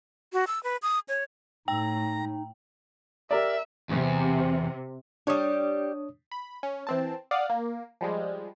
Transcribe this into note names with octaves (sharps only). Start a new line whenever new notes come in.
F#4
E6
B4
D#6
C#5
A2 D#4 G5 A#5
G4 A#4 D5 E5
E2 C3
G3 D4 G4 C#5 D#6
B5
C#4
E3 C4 A5
D5 F5 F#5 D#6
A#3
F3 G3 G#3